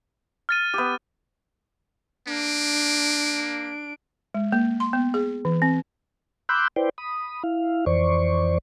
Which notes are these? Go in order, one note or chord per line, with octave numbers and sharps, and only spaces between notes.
F6 A6 D#7
B3 G4
A#3 D4 D7
G#3
A#3
C6
B3
G#4
E3
C4
B5 C6 D6 E6 F#6 G6
E4 B4 C5 D5 G5
B5 D#6
E4 F5
F2 E3 C5 D5 C#6